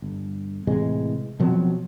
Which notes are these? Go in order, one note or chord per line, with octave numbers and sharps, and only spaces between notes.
G1
A2 C3 E3 G#3
B2 F3 F#3 C4